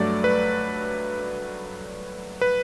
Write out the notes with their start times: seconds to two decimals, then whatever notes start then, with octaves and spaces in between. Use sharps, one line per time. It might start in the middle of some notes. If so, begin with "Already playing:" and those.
Already playing: G2 F#3 A3 D5
0.24 B4
2.41 B4